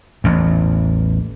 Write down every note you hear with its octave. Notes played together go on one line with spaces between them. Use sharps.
A1 E2